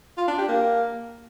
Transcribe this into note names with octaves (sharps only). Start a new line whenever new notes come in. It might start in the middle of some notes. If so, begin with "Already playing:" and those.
F4
D4
G4
A#3